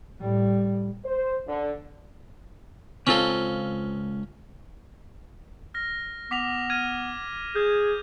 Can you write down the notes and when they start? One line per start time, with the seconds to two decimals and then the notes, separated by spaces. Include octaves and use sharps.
0.20 A2 G3
1.05 C5
1.47 D3
3.07 C#2 C4 C#4 F4 A4
5.74 F6 A#6
6.31 B3 D6 B6 F7
6.70 F6 G#6 D#7
7.55 G#4 G6